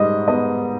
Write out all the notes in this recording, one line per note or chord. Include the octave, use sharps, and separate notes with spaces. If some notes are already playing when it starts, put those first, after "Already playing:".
Already playing: G#2 G3 D#5
B3 D#5